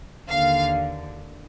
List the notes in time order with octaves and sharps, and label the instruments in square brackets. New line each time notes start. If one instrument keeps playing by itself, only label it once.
[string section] D#2 D3 F5